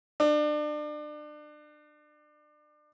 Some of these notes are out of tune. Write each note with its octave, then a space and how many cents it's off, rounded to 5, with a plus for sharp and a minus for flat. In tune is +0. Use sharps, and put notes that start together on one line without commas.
D4 +30